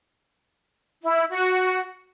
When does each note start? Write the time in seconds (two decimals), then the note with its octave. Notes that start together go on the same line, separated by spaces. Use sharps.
1.03 E4
1.30 F#4